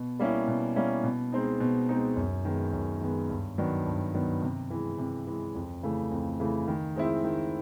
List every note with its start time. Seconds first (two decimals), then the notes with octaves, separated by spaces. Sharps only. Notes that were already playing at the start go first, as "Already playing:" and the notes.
Already playing: B2
0.19 G3 A#3 C#4 E4
0.47 B2
0.76 G3 A#3 C#4 E4
1.04 B2
1.32 G#3 C4 D#4
1.60 B2
1.89 G#3 C4 D#4
2.16 F#2
2.45 D#3 G#3 B3
2.73 F#2
3.01 D#3 G#3 B3
3.30 G2
3.58 D#3 F#3 B3 D4
3.86 G2
4.14 D#3 F#3 B3 D4
4.42 C3
4.70 E3 G#3
4.98 C3
5.27 E3 G#3
5.55 F2
5.83 C#3 E3 A3
6.11 F2
6.40 C#3 E3 A3
6.68 D#3
6.96 G#3 C4 E4
7.24 D#3